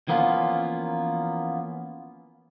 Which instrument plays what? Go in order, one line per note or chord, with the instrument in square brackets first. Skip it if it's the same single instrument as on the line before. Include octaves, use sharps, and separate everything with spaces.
[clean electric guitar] E3 F3 A#3 B3 C#4 F4